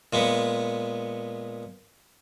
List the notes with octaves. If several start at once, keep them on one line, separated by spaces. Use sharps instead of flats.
A#2 G#3 B3